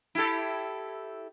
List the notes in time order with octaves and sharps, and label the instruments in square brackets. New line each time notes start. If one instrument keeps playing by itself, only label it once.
[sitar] E4 G4 A4